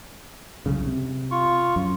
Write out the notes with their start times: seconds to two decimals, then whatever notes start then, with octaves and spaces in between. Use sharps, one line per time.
0.66 C2 F#2 C#3
0.86 C3
1.31 F4 C#6
1.76 F#2